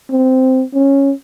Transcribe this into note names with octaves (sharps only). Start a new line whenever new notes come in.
C4
C#4